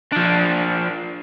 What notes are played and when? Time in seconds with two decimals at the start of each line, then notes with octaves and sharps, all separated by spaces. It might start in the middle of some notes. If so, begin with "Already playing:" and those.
0.12 F3 D4